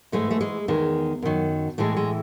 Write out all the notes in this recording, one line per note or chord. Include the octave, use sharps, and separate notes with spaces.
G#2 E3 G#3 A3
A3
G#3
E2 D#3 G#3
F#2 D#3 F#3
A2 E3 G#3 A3
G#3